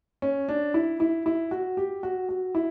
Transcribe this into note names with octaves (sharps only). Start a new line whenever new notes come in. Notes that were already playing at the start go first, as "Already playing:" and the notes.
C#4
D4
E4
E4
E4
F#4
G4
F#4
F#4
E4